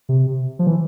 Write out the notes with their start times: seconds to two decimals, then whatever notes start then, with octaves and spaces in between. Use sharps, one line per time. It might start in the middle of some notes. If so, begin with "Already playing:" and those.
0.09 C3
0.59 F3
0.67 E3